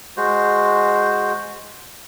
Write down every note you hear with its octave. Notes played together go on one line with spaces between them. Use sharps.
G#3 F#4 C5